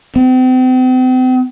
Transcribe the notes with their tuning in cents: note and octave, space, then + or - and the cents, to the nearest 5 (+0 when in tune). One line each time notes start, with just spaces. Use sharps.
C4 -40